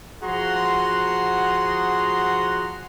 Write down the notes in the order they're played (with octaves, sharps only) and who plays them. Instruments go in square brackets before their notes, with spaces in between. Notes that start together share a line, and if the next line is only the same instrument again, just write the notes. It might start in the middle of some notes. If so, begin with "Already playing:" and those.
[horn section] F3 F#4 G#4 F#5 A#5 C6